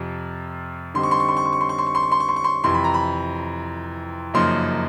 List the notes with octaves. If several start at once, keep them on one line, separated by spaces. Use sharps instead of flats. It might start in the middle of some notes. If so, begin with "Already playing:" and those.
Already playing: F2 C3 F3
D3 G3 C4 D#4 C6
C#6
C6
C#6
C6
C#6
C6
C#6
C6
C#6
C6
C#6
C6
C#6
C6
C#6
C6
C#6
C6
F2 C3 E3 C6
B5
A#5
B5
F#2 C#3 F3 A#3 D#4 C6